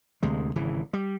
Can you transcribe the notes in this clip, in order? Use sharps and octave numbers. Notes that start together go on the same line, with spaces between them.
D2 C3 G#3
G#1 C#3 E3
G3